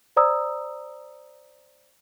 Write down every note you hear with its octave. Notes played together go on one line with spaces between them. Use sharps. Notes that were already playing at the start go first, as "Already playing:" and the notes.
C5 D5 A#5 D#6 E6